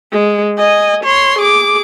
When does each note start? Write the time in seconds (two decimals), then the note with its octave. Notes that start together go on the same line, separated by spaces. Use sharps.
0.12 G#3
0.58 D#5 G#5
1.04 C#5 C6
1.39 G#4 D6